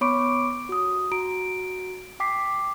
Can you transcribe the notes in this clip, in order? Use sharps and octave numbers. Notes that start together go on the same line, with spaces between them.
B3 C#5 B5 C#6 D6 D7
F#4 D#6
F#4 A#5 D7
G5 D6 B6 C7